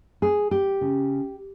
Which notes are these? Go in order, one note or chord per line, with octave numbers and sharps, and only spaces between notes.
G#4
G4
C#3